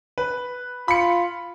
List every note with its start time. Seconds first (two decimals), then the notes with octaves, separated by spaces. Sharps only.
0.18 B4
0.88 F4 B5 C#7